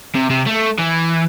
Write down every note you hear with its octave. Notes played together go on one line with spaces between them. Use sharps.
C3
C3
A3
E3